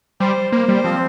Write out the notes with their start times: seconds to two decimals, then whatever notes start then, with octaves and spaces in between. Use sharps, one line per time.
0.20 G3 C5
0.52 A#3 C5
0.68 G3
0.84 F3 C4